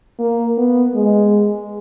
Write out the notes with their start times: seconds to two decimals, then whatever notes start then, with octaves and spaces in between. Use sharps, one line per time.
0.19 A#3
0.58 B3
0.95 G#3